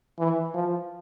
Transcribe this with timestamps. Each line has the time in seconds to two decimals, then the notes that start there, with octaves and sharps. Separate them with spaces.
0.19 E3
0.54 F3